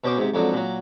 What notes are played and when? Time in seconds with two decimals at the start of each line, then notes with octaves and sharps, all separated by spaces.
0.04 B2 C#4 C5 D6
0.18 G#2 C3
0.34 F2 G#2 D3 F#3
0.53 A#2 F#3